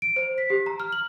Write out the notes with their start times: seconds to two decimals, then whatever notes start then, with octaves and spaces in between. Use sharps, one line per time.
0.02 D7
0.16 C5
0.38 B6
0.50 G4
0.66 A#5
0.80 F6
0.92 F#7